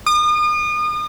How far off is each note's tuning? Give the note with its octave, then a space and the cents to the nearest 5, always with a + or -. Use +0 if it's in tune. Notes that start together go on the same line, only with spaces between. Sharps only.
D#6 -40